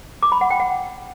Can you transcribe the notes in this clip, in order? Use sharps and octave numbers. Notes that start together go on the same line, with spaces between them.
D6
B5
F#5
G5
F#5